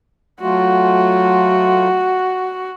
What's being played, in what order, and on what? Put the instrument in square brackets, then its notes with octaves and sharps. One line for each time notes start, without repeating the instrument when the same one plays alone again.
[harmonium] F#3 A3 F4 [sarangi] F#4